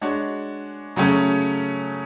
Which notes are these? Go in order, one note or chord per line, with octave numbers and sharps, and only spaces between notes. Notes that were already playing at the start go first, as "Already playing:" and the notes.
G#3 D4 F#4 C#5
C#3 F#3 A3 C#4